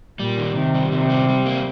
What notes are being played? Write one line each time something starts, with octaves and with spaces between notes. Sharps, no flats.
A#2 G3
D#3
C3 D#3
G3
C3 D#3
G3
G3
A#3